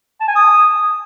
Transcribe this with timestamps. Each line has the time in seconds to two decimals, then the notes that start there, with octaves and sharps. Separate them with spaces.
0.21 A5
0.28 G#5
0.36 D#6